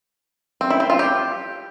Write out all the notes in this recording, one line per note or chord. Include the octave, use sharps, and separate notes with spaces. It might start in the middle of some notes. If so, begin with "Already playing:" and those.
C4
E4
C4
F4
G4